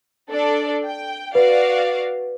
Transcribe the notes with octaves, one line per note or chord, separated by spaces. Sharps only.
D4 A4 D5
G5
F#4 B4 D5 F5